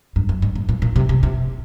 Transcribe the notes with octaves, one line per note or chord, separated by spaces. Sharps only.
G2
F#2
G#2
A2
A#2
A#2
C3
C3
C3